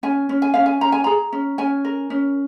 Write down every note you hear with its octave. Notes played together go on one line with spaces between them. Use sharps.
C#4 G#5
C#4
G#5
C#4 F5
G#5
C#4 A#5
G#5
G#4 A#5
C#4
C#4 G#5
A#4
C#4